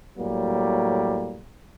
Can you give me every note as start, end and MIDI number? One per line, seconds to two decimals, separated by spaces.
0.18 1.41 45
0.18 1.41 54
0.18 1.41 55
0.18 1.41 58